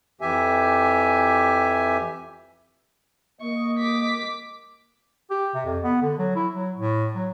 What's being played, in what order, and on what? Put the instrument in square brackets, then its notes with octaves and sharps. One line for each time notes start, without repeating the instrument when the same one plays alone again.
[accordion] F2 E3 G4 E5 G#5
[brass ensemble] A#3 D#5 [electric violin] C#6
[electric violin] D6 B6
[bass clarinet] G4
C3
F2
B3
D3
F#3
E4
F#3
A2
F#3